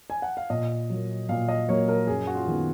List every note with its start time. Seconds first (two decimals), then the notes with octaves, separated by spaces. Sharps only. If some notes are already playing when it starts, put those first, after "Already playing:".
0.10 G#5
0.22 F#5
0.37 F5
0.50 A#2 D#5
0.90 F#3 A#3
1.29 A#2 F5
1.48 D#5
1.69 F#3 A#3 C#5
1.88 A#4
2.07 F#2 G#4
2.27 F#4
2.35 F4
2.47 D#3 G#3 B3